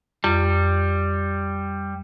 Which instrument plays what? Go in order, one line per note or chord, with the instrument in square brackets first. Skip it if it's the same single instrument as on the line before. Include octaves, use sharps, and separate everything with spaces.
[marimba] F2 [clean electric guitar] G3